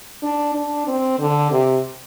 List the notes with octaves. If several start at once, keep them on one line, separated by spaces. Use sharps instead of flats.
D4
D4
C4
D3
C3